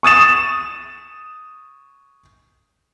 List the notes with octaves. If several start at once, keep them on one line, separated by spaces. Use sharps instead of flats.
C#6 D#6 A6 E7